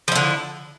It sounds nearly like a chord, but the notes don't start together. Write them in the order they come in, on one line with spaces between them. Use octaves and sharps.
F3 E4 D3